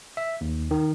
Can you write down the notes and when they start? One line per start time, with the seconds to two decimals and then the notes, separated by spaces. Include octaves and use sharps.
0.17 E5
0.41 D#2
0.71 D#3